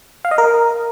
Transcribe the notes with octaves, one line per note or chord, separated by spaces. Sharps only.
F5
D#5
A#4